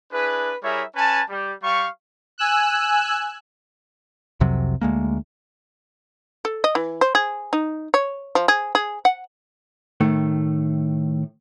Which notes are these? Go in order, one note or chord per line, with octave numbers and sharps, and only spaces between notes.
D4 E4 G#4 B4
G3 E4 G#4 A#4 C#5 E5
C#4 B4 G#5 A5
G3 G4
G3 G4 F5 C#6
G#5 E6 F#6
C2 F2 C3 F#3
D2 G#3 A#3
A4
D#5
E3
C5
G#4
D#4
C#5
F3
G#4
G#4
F#5
A2 D#3 A3